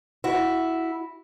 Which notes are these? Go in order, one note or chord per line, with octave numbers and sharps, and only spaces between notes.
E4 F#4